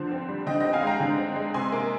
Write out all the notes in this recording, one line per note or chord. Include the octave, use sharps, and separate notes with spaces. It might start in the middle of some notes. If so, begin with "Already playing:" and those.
Already playing: D3 F3 C5
C4
G3
D3 D#5 G5
C4 D#5 G5
F5 G#5
G#3 G5 A#5
D3
C4
G#3
C3 G#5 C6
A#3